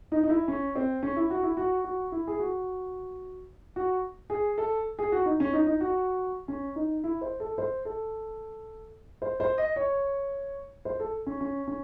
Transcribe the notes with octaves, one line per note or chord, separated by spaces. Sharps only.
D#4
D#4
E4
C#4
C4
C#4
E4
F#4
E4
F#4
F#4
E4
G#4
F#4
F#4
G#4
A4
G#4
F#4
D#4
C#4
D#4
D#4
F#4
C#4
D#4
E4
C5
A4
C5
A4
C5
C5
D#5
C#5
C5
A4
C#4
C#4
C#4